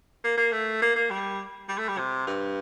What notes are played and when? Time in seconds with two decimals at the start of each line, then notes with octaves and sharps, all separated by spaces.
0.24 A#3
0.37 A#3
0.52 A3
0.82 A#3
0.96 A#3
1.10 G3
1.68 G3
1.78 A3
1.88 G3
1.98 C3
2.27 G2